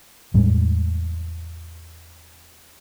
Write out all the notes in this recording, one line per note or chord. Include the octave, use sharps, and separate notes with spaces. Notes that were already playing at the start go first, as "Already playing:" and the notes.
E2 A2 G3 G#3